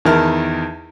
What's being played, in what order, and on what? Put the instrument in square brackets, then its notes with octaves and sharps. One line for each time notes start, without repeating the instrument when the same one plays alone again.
[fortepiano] E2 D#3 E4 A#4 A5 F6